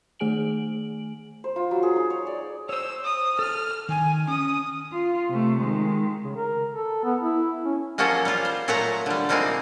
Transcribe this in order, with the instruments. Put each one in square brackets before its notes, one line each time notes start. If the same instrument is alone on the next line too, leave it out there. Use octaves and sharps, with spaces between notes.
[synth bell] D#3 A3 G#4 G#5 D7 F#7
[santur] C5
F4
F#3
G#4
D#4
C#5
D5
[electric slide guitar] C5 C#5 [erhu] E6
[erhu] D#6
[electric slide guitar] A4 [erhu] F6
[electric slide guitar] D#3 [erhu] G#5
[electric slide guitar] C#4 [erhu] D#6
[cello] F4
C3 A3
D#3 G#3
[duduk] C#3
A#4
A4
B3
E4
C#4
[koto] F3 F#3 A#3 C#4 F#4 A4
G3 F4
C5
A#2 F#3 A3 E5 F#5 A#5
D3 G3
F3 G3 G#3 A#3 C4 D#4